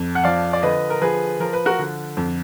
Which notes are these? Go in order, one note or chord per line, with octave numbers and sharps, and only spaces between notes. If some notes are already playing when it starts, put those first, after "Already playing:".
Already playing: F2
F#5
F3 D5 F5
D5
D3 B4 D#5
A#4
F3 G#4 B4
F3 A#4
B4
F#4 A#4
D3
F2